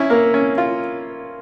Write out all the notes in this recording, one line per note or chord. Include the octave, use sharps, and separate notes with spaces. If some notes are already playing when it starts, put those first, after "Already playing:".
Already playing: C#4 E4
A#3
C#4
F4